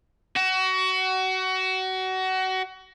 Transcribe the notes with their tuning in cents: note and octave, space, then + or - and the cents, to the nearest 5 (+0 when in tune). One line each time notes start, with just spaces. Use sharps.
F#4 +25